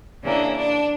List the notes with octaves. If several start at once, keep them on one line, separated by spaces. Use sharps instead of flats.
C#3 E3 A#3 D4
D4